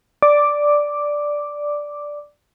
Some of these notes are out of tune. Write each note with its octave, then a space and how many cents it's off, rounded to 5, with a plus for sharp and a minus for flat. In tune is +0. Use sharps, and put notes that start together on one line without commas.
D5 +0 D6 +0